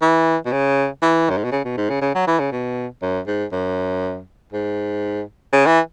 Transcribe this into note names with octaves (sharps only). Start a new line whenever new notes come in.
E3
B2
C#3
E3
F#2
G#2
B2
C#3
B2
G#2
C#3
C#3
F#3
E3
C#3
B2
F#2
G#2
F#2
G#2
C#3
E3